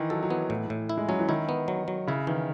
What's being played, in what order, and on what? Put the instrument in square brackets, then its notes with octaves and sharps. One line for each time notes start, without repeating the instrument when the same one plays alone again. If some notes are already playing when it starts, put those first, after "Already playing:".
Already playing: [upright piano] D#3 E3
[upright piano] F#3 [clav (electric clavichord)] A4
[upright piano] F#3
[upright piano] E3 [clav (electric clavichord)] B3
[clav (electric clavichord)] A2
A2
E4
[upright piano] G#3
[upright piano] F#3 [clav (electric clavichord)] C#4
[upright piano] E3
[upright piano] D#3 [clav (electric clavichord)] E4
[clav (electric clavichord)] B3
F#3
F#3
[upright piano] C#3 [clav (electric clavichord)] E4
[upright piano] D#3 [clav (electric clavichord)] E3